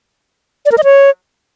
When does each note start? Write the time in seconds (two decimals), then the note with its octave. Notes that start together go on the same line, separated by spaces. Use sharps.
0.66 D5
0.72 A#4
0.78 D#5
0.84 C#5